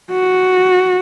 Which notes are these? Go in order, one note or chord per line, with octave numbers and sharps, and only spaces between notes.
F#4